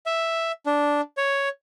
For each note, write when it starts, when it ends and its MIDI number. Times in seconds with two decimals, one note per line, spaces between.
0.06 0.52 76
0.66 1.01 62
1.17 1.49 73